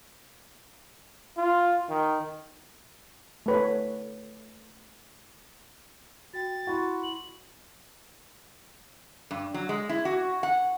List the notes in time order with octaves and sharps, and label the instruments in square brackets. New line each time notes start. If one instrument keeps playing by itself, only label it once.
[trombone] F4
D#3
[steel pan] A3 B4 C#5
[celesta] F#4 G5 [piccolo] A6
[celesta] E4 B5 C6 [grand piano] F#4
[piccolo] F#7
[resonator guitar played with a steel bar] G2
F#3
G#3
E4
F#4
F#5